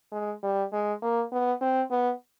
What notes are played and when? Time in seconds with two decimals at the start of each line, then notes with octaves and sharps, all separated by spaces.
0.12 G#3
0.43 G3
0.73 G#3
1.02 A#3
1.32 B3
1.61 C4
1.91 B3